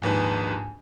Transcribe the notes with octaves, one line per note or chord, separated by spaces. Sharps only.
A#1 D#2 G#2 B4 G#5